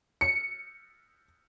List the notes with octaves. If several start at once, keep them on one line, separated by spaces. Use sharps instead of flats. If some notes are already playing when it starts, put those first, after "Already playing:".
C#7